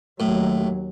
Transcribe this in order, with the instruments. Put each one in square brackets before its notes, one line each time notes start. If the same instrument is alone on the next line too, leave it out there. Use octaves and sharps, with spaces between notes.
[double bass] D#2 F#3 [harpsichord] A2